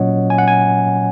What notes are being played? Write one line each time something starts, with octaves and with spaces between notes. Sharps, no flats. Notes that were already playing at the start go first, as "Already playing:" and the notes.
Already playing: A#2 F#3 C#4 C#5 D#5 F#5
G#5
F#5
G#5